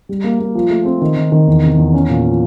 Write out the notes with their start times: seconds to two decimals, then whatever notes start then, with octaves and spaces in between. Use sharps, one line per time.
0.09 G3
0.24 A#3
0.40 A#3
0.55 F3
0.70 A3
0.85 C4
1.01 D#3
1.16 D#3
1.32 D#3
1.47 E2
1.63 C3
1.78 E2
1.94 C#4
2.09 A#2
2.24 F3